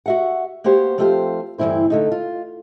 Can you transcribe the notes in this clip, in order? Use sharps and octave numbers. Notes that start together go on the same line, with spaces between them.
F#4 E5 F#5
A#3 B3 F#4 G4 C5
F3 A3 C4 F4 G4 C5
D2 G2 E3 C4 E4 C5
D3 A3 D#4
F4